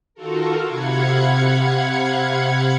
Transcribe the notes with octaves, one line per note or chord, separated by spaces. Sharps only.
D#3 F4 F#4 A4 A#4
C3 F5 F#5 B5 G#6 C#7